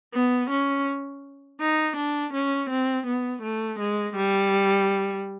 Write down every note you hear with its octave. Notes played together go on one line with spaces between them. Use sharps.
B3
C#4
D#4
D4
C#4
C4
B3
A3
G#3
G3